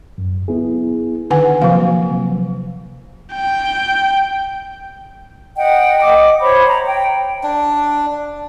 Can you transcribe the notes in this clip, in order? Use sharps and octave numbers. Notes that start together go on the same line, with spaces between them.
F#2
B3 E4 G#4
D3 D#3 B4 F#5 G#5
C3 F3 F#3 A#3 F5
G5
D#5 F#5 G5
D#5 D6
C5 C#5 B5
A#5
G5
D4